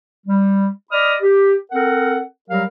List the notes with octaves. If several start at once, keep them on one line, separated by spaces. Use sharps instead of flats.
G3
D5 D#5 B5 D#6 F6
G4
C4 A4 A#4 F#5
F#3 G3 G4 A#4 F5